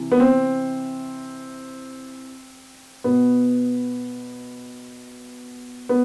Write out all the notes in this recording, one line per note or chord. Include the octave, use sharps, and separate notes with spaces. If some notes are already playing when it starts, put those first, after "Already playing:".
Already playing: C3 E3
B3
C4
B2 B3
B3